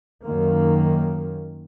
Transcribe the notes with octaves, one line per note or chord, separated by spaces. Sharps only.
F#2 D#3 A#3